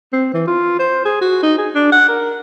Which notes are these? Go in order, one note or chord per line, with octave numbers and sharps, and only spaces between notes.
C4
E3
F4
C5
G#4
F#4
D#4
G#4
D4
F#5
A#4